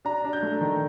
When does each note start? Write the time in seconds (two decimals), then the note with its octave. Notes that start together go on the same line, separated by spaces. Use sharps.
0.05 D4 A#5
0.24 D4
0.33 G6
0.42 A3
0.61 D#3